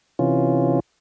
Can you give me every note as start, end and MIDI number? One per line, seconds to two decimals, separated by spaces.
0.19 0.80 48
0.19 0.80 52
0.19 0.80 61
0.19 0.80 65